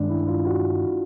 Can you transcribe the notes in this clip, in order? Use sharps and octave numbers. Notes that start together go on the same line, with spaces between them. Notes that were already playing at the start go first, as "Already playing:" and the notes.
Already playing: G2 D#3 G#3 C#4 D4
E4
F4
F#4